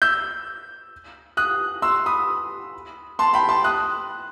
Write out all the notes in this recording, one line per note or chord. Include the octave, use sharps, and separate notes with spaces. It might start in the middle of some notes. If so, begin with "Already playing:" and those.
E6 G6
D#6 F#6
C6 E6
B5 D#6
A5 C6
G5 B5
A5 C6
D#6 F#6